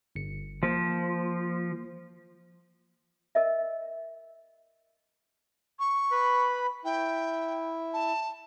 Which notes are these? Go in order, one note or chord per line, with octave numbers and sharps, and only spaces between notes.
G1 C#7
F3 A#3 C5
A#4 D#5 E5
C#6
B4 B5
E4 G5
A5